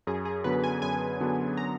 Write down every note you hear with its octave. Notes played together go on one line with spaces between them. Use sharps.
F#2 G#4
G#4
D3 F#3 B3 D4 B4
G#5
F#2 G#5
D3 F#3 B3 D4
A#5